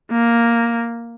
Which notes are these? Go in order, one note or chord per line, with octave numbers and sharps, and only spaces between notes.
A#3